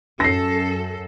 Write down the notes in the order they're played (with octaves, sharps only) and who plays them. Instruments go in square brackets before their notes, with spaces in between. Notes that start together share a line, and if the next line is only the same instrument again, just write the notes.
[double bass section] F#2 [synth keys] C#4 [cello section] A4 [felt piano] A#6 C7